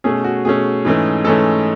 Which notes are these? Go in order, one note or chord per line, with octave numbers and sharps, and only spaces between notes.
B2 A3 C#4 G#4
F#4
B2 A3 C#4 G#4
G#2 E3 A3 C#4
G#2 E3 A3 C#4 A4